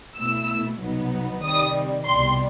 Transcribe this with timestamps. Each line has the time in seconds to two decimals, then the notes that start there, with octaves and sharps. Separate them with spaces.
0.17 B2 A3 E4 E6
0.80 C2 B2 F#3 B3 D#4
1.43 C3 D#3 G3 D#6
2.05 C2 B2 G3 C6